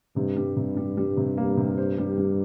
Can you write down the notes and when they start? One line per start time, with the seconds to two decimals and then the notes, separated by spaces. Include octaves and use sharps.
0.16 G2 C3
0.36 G3
0.56 C3
0.77 G3
0.97 G3
1.17 C3
1.37 A#3
1.57 C3
1.78 C5
1.98 G3
2.18 G3